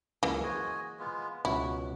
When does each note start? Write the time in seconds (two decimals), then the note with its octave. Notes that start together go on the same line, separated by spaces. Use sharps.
0.23 C#2 F#2 E3 G#3 A#3 A4
0.43 F#4 G#4 C5 D#5 G#5
0.99 G#3 B3 F4
1.45 C#2 B2 F#3 E4 F#4